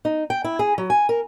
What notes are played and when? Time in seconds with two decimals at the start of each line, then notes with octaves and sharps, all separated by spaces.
0.05 D#4
0.30 G5
0.44 E4
0.59 G#4
0.78 F#3
0.90 G#5
1.09 A#4